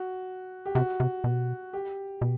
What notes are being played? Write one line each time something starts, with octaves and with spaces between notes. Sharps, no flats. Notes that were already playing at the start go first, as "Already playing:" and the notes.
Already playing: F#4
G4
C3 F#4
C3
B2
G4
B2